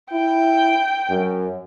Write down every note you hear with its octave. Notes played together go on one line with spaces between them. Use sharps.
E4 G5
F#2